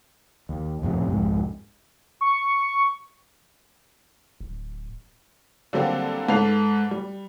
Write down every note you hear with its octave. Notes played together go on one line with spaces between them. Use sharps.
D#2
D#1 F2 A2 C3
C2 F2 G#2
C#6
D1
D3 F#3 G3 A#3 C4
G#2 A4 B4 C7 F7
G3